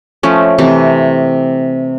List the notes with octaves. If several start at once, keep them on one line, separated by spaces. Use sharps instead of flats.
F3 A3 C#4
C3 E3 A3 C4